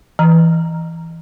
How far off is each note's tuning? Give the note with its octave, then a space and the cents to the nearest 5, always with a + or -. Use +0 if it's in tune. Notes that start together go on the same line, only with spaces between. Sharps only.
E3 +0 A#5 +0